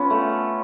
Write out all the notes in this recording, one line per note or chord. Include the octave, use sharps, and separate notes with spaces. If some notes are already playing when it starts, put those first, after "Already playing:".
Already playing: B3 C#4 F4
A3